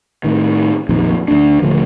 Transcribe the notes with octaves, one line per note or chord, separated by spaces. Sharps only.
A2 D#3
A#1 F2 A#2 D#3
D2 B3 D4
D#1 D3 F3 A3